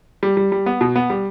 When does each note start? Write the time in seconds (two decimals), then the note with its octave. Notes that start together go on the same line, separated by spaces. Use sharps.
0.23 G3
0.37 G3
0.52 G3
0.66 B3
0.81 B2
0.96 B3
1.10 G3